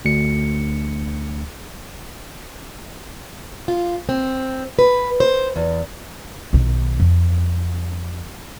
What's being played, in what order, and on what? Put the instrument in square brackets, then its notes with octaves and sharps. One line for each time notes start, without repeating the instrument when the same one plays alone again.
[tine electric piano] D2 C#7
[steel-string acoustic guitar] F4
C4
B4
C5
E2
[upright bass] B1 D#3
F2